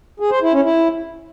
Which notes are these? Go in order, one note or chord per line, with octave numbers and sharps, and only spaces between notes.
G#4
C5
E4
C#4
E4